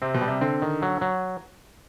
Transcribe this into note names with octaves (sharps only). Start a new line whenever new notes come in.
C3 C4
B2
G3
C3
D3 C4
D#3
F#3
F#3